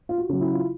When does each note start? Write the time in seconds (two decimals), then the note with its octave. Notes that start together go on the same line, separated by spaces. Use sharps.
0.09 F4
0.18 F#4
0.29 C#3 F#3
0.41 E4
0.53 F4